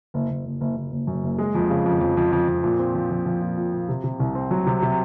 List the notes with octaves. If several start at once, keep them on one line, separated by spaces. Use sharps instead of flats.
F#1
F#1
F#1
F#1
F#1
F#1
F#2
F#1
G#3
F2
C#3
F2
F2
F2
F2
F2
A#2
C4
F3
F3
F3
A#2
A#2
A#2
C3
C3
C2
C4
F#3
C3
C3